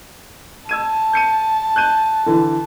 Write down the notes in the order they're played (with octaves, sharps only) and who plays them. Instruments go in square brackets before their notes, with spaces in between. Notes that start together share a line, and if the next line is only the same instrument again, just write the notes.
[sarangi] A5 [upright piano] E6 G#6 D#7
[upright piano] G6 C#7 D#7
F#6 G6 D#7
D3 E3